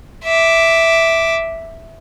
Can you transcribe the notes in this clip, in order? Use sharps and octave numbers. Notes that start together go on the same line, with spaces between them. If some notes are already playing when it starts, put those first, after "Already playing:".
E5 D6